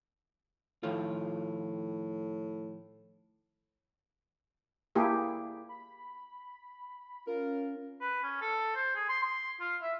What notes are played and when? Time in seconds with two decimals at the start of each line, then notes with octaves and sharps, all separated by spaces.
0.83 A2 D#3 F3 F4
4.95 A#3 E4 G4 G#4
5.69 B5
7.27 C#4 F4 A#4
8.01 B4
8.23 C#4
8.41 A4
8.75 C5
8.95 G#4
9.09 C6
9.23 C6
9.60 F4
9.82 E5